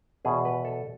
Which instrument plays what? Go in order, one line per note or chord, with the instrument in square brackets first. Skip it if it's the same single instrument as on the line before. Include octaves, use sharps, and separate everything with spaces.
[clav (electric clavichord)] E2 B2 G#4
B4
A4